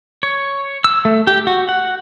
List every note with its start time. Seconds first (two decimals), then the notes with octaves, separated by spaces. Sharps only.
0.23 C#5
0.84 E6
1.05 A3
1.27 G4
1.47 F#4
1.69 F#5